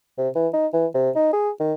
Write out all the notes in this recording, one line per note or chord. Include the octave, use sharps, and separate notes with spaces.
C3
E3
D#4
E3
C3
D#4
G#4
D#3